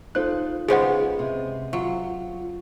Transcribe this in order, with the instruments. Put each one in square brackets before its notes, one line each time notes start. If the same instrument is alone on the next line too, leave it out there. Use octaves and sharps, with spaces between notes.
[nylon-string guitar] D#4 F4 A4 [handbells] C5 F#6
[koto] C#3 G#3 B3 [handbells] G#4 C5 F#5
[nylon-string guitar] C3
[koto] F#3 [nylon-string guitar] F4